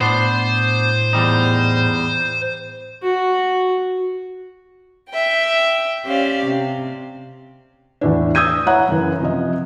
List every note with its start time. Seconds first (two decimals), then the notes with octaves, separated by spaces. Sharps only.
0.01 A2 B3 D4 C5
1.13 E2 G3 D#4
3.03 F#4
5.10 E5 G5
6.05 C#4 G4 C5 D5 F5
6.45 C3
8.01 E2 A2 D4
8.35 D#6 E6 G6 G#6 D#7
8.67 E4 C#5 F#5 A#5 F#6
8.89 F#2 C#3 E3
9.20 C3 F3 D#5